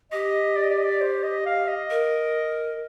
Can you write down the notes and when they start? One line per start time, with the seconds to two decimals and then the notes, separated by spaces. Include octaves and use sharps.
0.12 G4 D#5
0.57 D5
0.63 D#5
0.71 D5
0.78 D#5
0.85 D5
1.01 C5
1.23 D#5
1.46 F5
1.68 D#5
1.90 A#4